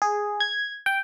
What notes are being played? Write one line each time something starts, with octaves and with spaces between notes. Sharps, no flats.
G#4
G#6
G5